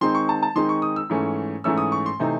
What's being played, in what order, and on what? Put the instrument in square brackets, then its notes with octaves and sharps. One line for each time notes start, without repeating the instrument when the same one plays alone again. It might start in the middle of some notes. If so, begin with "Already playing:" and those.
[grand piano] D#3 G#3 C4 D#4 C6
C#6
A5
A5
D#3 G#3 C4 D#4 C6
C#6
D#6
E6
G#2 E3 A3 C#4
G#2 E3 A3 C#4 E6
D#6
C#6
C6
C3 E3 A3 C4 D#4